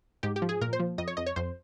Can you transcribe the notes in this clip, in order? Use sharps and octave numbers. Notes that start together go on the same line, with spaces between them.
G#2 G4
G4
F3
G#4
A#2 A#4
C5
F3
F2 D#5
C#5
F2 D#5
C#5
F2 C5